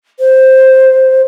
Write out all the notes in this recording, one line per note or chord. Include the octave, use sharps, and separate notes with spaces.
C5